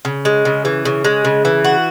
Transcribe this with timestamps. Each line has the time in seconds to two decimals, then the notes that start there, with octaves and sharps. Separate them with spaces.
0.05 C#3
0.25 G#3
0.45 C#3
0.65 E3
0.85 C#3
1.04 G#3
1.25 C#3
1.45 E3
1.64 F#4